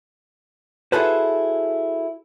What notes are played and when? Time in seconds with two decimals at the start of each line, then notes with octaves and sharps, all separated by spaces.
0.92 E4 F#4 G#4 A4 B4 C5